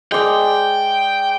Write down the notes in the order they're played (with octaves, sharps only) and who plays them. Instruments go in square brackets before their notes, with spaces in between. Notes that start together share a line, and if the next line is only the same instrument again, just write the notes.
[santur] G#3 D5 [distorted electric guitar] G5